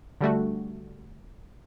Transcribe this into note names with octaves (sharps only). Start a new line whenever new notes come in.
D3 G3 A3 F#4